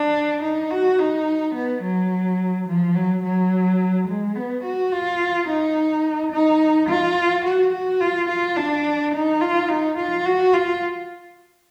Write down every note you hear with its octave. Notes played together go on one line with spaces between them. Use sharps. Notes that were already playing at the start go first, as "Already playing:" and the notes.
Already playing: D4
D#4
F#4
D#4
B3
F#3
F3
F#3
F#3
G#3
B3
F#4
F4
D#4
D#4
F4
F#4
F#4
F4
F4
D4
D#4
F4
D#4
F4
F#4
F4